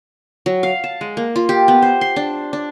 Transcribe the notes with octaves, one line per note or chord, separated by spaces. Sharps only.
F#3
F5
A5
G#3
A#3
F4
G4
B3
C5
C6
D4
D4